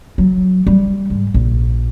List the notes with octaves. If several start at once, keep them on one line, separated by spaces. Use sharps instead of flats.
F#3
G3
G#2
A#1